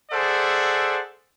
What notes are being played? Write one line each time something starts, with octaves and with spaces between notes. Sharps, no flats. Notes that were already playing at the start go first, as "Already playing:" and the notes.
G#4 A4 C5 D5 E5 F#5